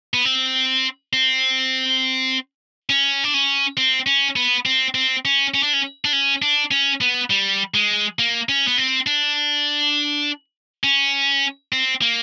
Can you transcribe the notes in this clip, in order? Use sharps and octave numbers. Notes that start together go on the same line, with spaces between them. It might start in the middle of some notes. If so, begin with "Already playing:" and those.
B3
C4
C4
C#4
D4
C#4
C4
C#4
B3
C4
C4
C#4
C#4
D4
C#4
D4
C#4
D4
C#4
B3
G3
G#3
A#3
C#4
B3
C4
D4
C#4
C4
A#3